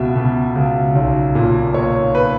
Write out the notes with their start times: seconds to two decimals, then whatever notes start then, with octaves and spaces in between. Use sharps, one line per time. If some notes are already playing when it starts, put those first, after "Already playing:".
Already playing: C#2 B2 E5
0.16 B2
0.55 C#2
0.95 B1
1.35 A#2
1.74 A#2 C#5
2.15 B4